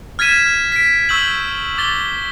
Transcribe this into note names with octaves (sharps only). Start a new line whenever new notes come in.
F6 G#6 A6 B6 D#7 E7
B6 D7
C#6 E6 G6 F#7
D6 A6 G7